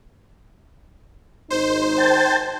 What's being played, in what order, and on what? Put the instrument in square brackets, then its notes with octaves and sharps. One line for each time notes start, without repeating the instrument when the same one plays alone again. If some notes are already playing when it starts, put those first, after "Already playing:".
[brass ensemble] G#1 D#4 [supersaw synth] C5
[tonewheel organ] G5 A5